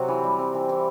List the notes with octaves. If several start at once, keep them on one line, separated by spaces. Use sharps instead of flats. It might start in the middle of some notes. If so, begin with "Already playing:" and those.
Already playing: C3 F#3 C4
E3
G3
C4
E3
E3